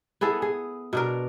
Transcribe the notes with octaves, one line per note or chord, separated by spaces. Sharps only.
B3 E4 G#4 A4
G#4
B2 D4 A#4